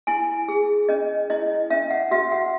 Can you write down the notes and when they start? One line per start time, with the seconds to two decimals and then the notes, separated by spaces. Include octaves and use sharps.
0.07 E4 G#5
0.48 G#4
0.89 C#4 D#5
1.30 E4 D#5
1.70 C#4 E5
1.90 F#5
2.11 F#4 E5
2.32 F#5